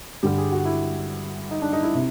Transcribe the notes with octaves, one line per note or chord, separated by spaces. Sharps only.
G2 D3 G3 G4
G#4
F#4
E4
D#4
D4
D#4
E4
C3